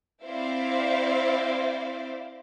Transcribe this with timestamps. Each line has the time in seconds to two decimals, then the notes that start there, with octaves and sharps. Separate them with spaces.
0.24 C4 E4 C5 D5 E5 F5